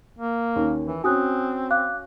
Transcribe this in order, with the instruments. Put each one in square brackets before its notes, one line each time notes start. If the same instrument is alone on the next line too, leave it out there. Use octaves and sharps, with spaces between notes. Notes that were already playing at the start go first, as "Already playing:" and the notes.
[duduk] A#3
[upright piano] D#2 C#4
[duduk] E3
[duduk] C4 [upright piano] C#4 F#4 [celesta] G#5 D#6 F#6
[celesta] F5 D6 F#6